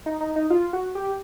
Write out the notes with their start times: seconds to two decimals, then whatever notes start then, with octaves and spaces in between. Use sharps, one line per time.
0.06 D#4
0.20 D#4
0.36 D#4
0.50 F4
0.73 F#4
0.95 G4